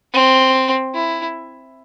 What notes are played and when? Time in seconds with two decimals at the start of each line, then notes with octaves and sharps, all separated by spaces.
0.13 C4
0.95 E4